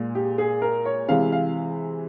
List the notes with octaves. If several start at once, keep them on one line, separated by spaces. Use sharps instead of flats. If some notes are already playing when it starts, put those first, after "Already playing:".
Already playing: A#2 G#3
G4
G#4
A#4
C#5
C3 E3 G#3 F5
F5